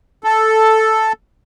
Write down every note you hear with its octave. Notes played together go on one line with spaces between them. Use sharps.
A4